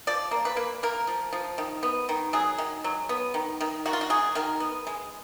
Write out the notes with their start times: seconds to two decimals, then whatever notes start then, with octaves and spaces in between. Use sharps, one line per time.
0.07 F3 D5
0.31 A#3
0.45 B4
0.57 A#3
0.83 A#3 A#4
1.07 F3
1.33 F3
1.58 D#3
1.83 B3
2.09 D#3
2.33 F#3 G#4
2.58 D#3
2.84 F#3
3.09 B3
3.34 D#3
3.61 D#3
3.86 D#3 F#4
3.93 F4
4.01 F#4
4.10 F#3 G#4
4.35 D#3 A#4
4.60 B3
4.87 G#3